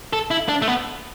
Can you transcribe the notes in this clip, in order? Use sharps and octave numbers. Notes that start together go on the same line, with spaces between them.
A4
E4
D4
A3
B3